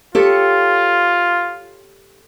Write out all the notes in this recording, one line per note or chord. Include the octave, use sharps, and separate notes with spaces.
F4 G4 A4 C#5